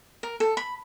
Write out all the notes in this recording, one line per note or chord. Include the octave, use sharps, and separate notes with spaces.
A#4
A4
B5